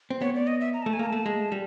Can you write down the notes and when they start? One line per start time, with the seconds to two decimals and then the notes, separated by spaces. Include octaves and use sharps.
0.10 C4
0.21 B3 C#5
0.35 D5
0.47 D#5
0.60 E5
0.74 A#5
0.82 A3 A5
0.93 G#5
0.99 A#3 A#5
1.06 A5
1.12 A3
1.26 G#3
1.52 G3